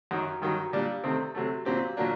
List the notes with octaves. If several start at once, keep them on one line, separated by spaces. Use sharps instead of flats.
F#2 D#3 F#3
G2 D#3 F#3
A#2 G3 D4
C3 D#3 A3 C4
C3 F#3 A3
A#2 F#3 C4 G4
A#2 F#3 A#3 D4